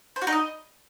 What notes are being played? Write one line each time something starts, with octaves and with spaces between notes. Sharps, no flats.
C5
F#4
D#4
D#5